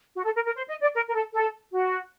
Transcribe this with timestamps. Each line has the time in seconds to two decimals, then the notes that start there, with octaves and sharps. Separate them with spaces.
0.16 F#4
0.25 A4
0.35 A#4
0.45 A#4
0.55 C5
0.68 D#5
0.81 D5
0.95 A#4
1.09 A#4
1.15 A4
1.34 A4
1.73 F#4